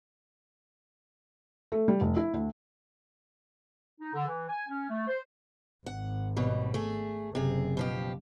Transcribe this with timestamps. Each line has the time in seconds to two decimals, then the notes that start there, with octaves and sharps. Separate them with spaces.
1.72 A3
1.88 G3
2.01 F1
2.16 E4
2.34 D2
4.01 D#4
4.13 D3
4.27 E3
4.49 G#5
4.68 C#4
4.89 A3
5.07 C5
5.86 G#1 F#5
6.36 D#2 B2 G3
6.74 A3 G#4
7.35 F#1 C3 G#4
7.77 B2 F3 G4